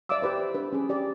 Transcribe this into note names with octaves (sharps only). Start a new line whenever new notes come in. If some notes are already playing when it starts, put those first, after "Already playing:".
D5 E5 F5 D6 E6
G4 B4 C5 E5
D4 B4
C#4 G#4
G4 D5